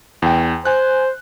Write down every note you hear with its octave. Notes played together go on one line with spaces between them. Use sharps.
E2 G5
C5 G#5 F#6